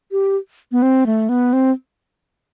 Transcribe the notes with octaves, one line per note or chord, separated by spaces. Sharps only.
G4
B3
C4
A3
B3
C4